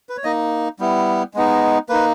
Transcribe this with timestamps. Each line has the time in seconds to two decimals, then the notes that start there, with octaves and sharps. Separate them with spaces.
0.09 B4
0.17 C#5
0.24 A#3 D#4 D#5
0.79 G3 B3 E4
1.34 G#3 B3 D#4
1.89 A#3 D#4 B4